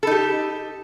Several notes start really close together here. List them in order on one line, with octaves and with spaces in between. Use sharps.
A4 D#4 G4